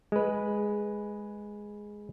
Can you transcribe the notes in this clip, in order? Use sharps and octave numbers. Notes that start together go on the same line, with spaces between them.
G#3 B4